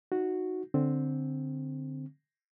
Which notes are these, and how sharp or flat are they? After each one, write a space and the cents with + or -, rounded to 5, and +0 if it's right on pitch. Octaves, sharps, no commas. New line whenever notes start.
D#4 +0 F#4 -5
D3 +0 C4 +0